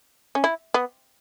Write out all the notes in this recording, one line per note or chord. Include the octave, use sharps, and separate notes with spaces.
C#4
E4
B3